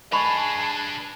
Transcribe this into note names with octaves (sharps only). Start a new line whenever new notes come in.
D4 G#4 B4 D#5 A5 B5 C#6